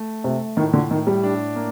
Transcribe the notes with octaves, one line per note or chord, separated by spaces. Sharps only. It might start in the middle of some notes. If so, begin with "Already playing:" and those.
Already playing: A3
C3 A3
A2 D#3
D3
A2 D#3
G3
D4
A#3